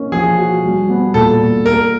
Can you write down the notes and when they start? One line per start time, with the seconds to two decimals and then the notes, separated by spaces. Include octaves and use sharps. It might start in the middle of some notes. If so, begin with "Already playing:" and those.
Already playing: A#3 C#4 D#4
0.12 F3 G#4
0.37 F#4
0.63 G3
0.89 B3
1.14 A#2 A4
1.40 A#2
1.66 A3 A#4